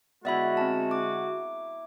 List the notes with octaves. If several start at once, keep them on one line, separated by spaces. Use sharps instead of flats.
D3 G#3 B3 E4 F#4 D5 E5 B5
C4 A5 A#5
D6